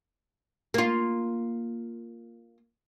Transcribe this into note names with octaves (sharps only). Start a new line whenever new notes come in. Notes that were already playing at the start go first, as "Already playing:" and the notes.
A#3 F4